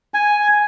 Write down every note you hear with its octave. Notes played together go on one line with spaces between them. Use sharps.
G#5